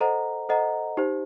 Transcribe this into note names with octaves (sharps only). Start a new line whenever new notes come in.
A4 C5 D#5 F#5 A#5
A4 C5 D#5 F#5 A#5
D#4 G4 C5